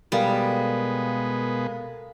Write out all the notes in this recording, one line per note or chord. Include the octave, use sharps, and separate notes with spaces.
B2 G3 G#3 B3 A4 A#4 F5